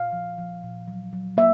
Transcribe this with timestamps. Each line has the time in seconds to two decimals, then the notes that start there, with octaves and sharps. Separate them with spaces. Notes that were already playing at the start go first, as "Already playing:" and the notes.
Already playing: A#2 F5
0.13 F3
0.38 F3
0.63 A#2
0.88 F#3
1.13 F#3
1.37 A#3 E5